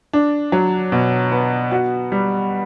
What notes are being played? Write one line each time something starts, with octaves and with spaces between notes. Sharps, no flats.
D4
F#3
B2
B3
F#4
G3